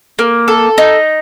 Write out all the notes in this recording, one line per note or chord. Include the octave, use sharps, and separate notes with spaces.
A#3
A4
D#4